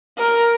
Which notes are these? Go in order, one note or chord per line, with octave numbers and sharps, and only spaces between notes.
A#4